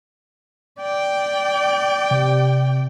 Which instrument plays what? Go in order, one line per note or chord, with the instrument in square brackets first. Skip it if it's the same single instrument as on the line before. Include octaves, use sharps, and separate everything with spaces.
[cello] D5 G5
[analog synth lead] C3